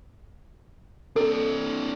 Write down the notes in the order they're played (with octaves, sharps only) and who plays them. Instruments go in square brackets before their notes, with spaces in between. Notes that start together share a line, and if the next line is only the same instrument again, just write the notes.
[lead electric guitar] C4 D4 [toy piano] A4